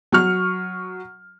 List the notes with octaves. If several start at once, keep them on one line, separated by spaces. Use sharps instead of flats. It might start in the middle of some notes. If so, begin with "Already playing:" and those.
F#3 C#6 F6